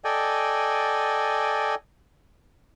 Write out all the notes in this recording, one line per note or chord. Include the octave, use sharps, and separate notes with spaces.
A4 D5 D#5 G5 G#5